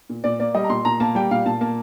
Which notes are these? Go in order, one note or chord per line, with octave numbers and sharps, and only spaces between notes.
A#2
A#2 D5
A#3 D5
G3 D#5
A#5
A#2 C6
A#2 A#5
A#3 A5
G3 G5
A#2 F5
A#2 A5
A#3 A5